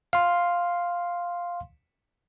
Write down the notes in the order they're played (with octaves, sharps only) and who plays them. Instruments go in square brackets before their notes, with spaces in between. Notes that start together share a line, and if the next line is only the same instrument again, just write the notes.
[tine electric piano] F5 C6